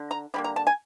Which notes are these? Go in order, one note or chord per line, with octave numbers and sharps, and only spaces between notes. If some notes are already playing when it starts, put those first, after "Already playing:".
Already playing: D3
A#5
D3 G3 A#3 B5
A#5
A5
G#5